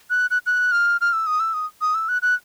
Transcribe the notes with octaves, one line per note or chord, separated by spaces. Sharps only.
F#6
F#6
F#6
F6
F6
E6
D#6
E6
D#6
D#6
E6
F#6
F#6